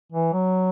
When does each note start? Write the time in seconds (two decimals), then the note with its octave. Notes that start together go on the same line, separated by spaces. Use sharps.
0.12 E3
0.33 F#3